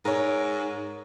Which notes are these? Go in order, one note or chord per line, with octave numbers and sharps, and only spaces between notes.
G#2 A#4 C#5